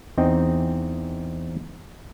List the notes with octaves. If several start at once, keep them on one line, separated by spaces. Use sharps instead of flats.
E2 C4 D#4 D#5 G5